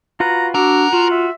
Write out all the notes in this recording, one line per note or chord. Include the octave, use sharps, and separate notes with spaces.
F4 F#4 B4 A#5
D4 F#4 A#4 F#5 D6 E6
F4 F#4
E5